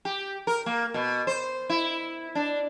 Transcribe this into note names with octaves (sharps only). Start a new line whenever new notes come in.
G4
A#4
A#3
B2
C5
E4
D4